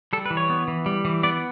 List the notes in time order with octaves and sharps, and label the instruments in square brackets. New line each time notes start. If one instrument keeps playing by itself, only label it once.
[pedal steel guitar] G3 A4
B4
E3
C#5
B3
E3
G3
E3
B3 D5